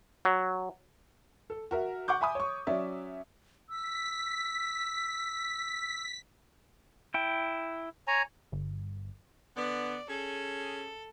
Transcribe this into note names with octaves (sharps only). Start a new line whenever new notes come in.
F#3
A4
F#4 A#4 E5
F#5 C#6 D6 G6
E5 G#5 B5 D#6
C#5 C#6
F#3 C#4 D5 E5
E6 B6
E4 G5
C#5 G#5 A#5
G1
D3 B3 D5
C#4 G#4 A4